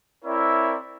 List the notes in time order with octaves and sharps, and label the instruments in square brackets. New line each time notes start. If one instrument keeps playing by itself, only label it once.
[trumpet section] C4 E4 A#4 C#5 D5 E5